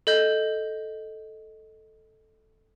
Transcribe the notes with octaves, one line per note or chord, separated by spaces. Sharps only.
A4 D#5 G6